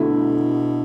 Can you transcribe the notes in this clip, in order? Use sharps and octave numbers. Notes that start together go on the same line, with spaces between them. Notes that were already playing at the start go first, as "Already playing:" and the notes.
Already playing: B2 D3 A3 E4 A4